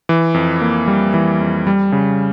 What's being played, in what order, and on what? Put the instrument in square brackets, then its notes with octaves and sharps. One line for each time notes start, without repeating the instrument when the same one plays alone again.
[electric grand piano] E3
F2
A#3
G3
E3
F2
G3
C#3